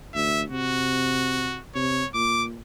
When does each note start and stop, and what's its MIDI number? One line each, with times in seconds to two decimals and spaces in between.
0.14 0.45 38
0.14 0.42 76
0.50 1.59 48
0.50 1.61 66
1.75 2.03 48
1.75 2.08 73
2.14 2.58 46
2.14 2.45 86